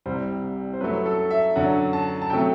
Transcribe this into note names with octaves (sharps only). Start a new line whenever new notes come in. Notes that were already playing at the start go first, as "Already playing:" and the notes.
C2 C3 G3 C5
C5
F#2 F#3 A3 B4
A4
E5
F#2 D3 F#3 F#5
A5
A5
C3 F#3 A3 G5